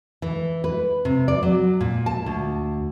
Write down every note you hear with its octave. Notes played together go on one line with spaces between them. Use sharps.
E3
B4
C3
D5
F#3
A#2
A5
D2